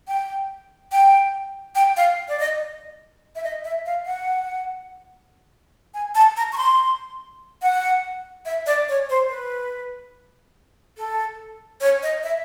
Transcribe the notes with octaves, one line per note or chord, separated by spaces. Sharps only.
G5
G5
G5
F5
D5
D#5
E5
D#5
E5
F5
F#5
G#5
A5
A#5
C#6
C6
F#5
E5
D5
C#5
C5
B4
A4
C#5
D#5
E5